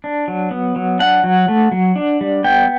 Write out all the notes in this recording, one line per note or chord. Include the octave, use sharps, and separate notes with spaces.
D4
F#3
B3
F#3
D4 F#5
F#3
A3
F#3
D4
G3
B3 G5